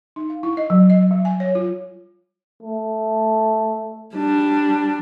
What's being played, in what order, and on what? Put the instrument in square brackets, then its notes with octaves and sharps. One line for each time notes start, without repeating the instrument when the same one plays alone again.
[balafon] D#4
F5
E4
D#5
F#3
D#5
G3
G#5
C#5
F4
[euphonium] A3
[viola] G3 D4